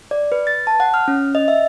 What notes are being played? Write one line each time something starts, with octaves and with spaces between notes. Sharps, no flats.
D5
B4
A6
A5
F#5
F6
C#4
D#5
E5